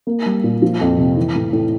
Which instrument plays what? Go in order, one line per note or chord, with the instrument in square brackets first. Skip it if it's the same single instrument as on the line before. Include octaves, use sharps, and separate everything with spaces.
[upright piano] A#3
G3
A#2
F3
F2
C3
E3
A2
A2